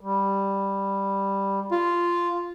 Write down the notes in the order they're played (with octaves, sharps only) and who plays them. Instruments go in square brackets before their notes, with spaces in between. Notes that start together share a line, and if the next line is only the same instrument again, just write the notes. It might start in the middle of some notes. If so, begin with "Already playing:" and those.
[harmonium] G3
[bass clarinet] F4